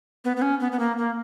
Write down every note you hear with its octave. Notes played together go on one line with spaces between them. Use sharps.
B3
B3
C#4
B3
B3
A#3
A#3